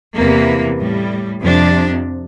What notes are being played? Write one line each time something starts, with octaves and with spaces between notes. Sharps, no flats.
E2 C3 E3 A#3
A2 G3
F2 C3 F3 D4